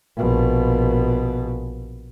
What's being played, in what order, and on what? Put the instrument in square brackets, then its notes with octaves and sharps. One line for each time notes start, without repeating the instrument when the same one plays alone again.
[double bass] A#1 B2